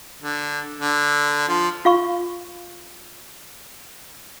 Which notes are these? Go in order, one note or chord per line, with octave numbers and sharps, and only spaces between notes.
D3
D3
F3
F4 F5 C#6